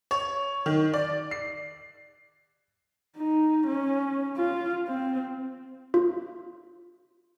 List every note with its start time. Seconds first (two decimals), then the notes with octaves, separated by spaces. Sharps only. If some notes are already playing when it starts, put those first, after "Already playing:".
0.11 C#5
0.66 D#3
0.94 D5
1.31 C7
3.17 D#4
3.67 C#4
4.37 F4
4.88 C4
5.94 F4